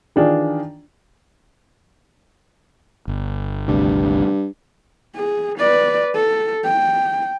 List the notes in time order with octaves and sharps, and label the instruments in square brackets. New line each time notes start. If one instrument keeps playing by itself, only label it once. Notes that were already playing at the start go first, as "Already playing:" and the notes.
[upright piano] D#3 E3 D4 F4 G#4
[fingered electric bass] G1
[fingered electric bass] G#1 D2 C3 [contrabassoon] G2
[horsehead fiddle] G#4
B4 D5
A4
G5